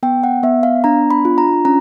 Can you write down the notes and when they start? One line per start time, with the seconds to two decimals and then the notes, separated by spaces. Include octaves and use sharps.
0.03 B3 G5
0.24 F#5
0.43 B3 E5
0.63 F5
0.84 D4 A#5
1.11 B5
1.25 F4
1.38 A#5
1.65 C#4 A#5